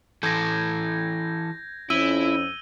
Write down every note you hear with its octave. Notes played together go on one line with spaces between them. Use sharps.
E3 A4 G6 G#6 A#6
F2 C#4 E4 E6 D#7 G7